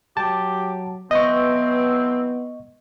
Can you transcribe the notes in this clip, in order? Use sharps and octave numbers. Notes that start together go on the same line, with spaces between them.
F#3 G4 A5 D6
E3 F#3 B3 C4 D#5 C#6